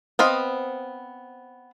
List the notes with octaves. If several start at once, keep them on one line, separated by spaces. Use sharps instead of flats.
B3 C4 D#5 F5